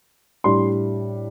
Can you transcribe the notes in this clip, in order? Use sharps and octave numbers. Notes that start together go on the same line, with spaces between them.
A2 G3 D4 C6